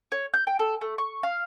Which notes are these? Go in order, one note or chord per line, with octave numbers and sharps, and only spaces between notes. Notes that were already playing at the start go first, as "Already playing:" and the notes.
C#5
G6
G5
A4
A3
C#6
F5